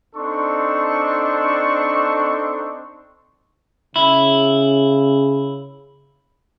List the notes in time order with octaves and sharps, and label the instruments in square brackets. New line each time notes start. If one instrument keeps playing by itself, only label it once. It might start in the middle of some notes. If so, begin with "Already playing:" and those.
[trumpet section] C4 D4 D#4 A4 C6 C#6
[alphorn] C#3 [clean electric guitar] E4